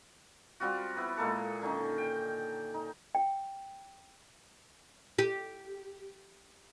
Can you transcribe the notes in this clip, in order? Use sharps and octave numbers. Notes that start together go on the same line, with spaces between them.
G3 C4 F4 F#4
B3 E4
A#2 G#3 A#3 A4
D3 D#3 C#4 D#4
G5
D#4
G5
G4